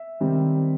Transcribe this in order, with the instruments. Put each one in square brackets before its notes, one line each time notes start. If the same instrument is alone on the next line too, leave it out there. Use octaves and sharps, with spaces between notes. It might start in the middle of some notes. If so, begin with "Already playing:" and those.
Already playing: [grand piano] E5
C3 D#3 G3 C4